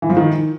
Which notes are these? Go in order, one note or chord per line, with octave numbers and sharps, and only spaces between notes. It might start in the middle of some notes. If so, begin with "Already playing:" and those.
E3
F3
D#3